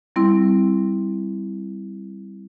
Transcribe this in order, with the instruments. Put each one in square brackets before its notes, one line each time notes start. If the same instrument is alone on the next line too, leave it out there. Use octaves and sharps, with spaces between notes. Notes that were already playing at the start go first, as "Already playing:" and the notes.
[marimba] G3 C4 E4